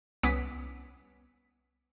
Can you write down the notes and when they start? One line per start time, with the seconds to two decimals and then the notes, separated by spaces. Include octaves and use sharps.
0.23 C2 B3 C#4 D6 D#6 B6